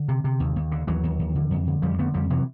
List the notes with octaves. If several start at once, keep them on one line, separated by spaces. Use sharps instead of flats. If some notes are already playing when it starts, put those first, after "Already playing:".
Already playing: D3
C3
C3
D#2
D#2
D3
D#2 E3 F#3
D#2
D#2
D3
F2
D3
F2 F3 G3
D3 A3 B3
F2 F3 G3
C3 E3 F#3